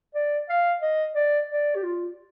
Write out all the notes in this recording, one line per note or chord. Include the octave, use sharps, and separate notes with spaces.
D5
F5
D#5
D5
D5
G4
F4